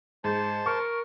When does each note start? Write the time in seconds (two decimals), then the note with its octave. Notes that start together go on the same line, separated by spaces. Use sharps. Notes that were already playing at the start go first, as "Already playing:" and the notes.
0.24 G#2 C5 A5
0.66 A#4 C#6